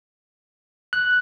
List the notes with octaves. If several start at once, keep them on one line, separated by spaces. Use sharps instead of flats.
F#6